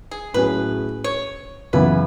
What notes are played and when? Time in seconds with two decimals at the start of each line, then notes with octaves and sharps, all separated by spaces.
0.11 G#4
0.34 A2 F#3 C#4 G#4 B4
1.04 C#5
1.73 F#2 C#3 E3 B3 E4 B4